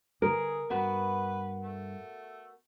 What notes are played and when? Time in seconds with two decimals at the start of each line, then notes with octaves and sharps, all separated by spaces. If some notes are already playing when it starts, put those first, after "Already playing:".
0.22 D3 G#4 A#4
0.70 G2 B3 F#4 B4
1.61 A3